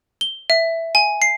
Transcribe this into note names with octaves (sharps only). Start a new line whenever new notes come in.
G7
E5
G#5
C7